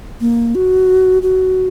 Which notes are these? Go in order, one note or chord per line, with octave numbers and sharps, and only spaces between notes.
A#3
F#4
F#4